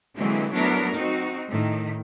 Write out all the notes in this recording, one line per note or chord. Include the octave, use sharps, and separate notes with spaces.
D3 E3 F#3 G#3 A#3 C4
F#3 A3 B3 D4 E4 A#4
C4 D#4 F#4
A2 D#3